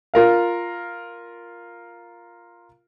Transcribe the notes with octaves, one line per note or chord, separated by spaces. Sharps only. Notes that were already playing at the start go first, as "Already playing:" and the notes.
F4 A#4 F5